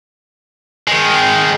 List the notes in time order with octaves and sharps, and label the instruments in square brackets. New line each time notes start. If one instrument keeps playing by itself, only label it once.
[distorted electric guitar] D#3 G#3